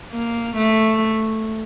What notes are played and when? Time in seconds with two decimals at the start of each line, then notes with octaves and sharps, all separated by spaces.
0.11 A#3
0.56 A3